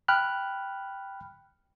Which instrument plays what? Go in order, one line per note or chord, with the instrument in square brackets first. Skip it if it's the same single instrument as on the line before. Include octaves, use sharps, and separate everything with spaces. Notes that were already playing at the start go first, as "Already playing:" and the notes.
[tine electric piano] G5 B5 F6 F#6